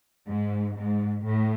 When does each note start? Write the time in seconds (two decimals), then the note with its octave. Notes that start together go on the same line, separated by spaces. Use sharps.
0.28 G#2
0.77 G#2
1.25 A2